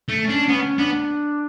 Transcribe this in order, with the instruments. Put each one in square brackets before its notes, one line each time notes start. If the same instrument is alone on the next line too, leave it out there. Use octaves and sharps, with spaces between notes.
[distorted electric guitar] A3
[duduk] C#4
[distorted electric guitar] D4
[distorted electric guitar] B3 [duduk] C#4
[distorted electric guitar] B3 [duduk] D4